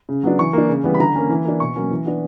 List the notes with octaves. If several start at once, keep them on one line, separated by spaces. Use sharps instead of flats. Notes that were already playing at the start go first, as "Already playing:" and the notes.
C#3
F#3 B3 D4
E3 C#6
A#3 D4
C#3
E3 G3 B3
B5
D3 A#5
A#3 C#4
E3
A#3 D4
B2 C#6
F#3 A#3 C#4
E3
B3 D4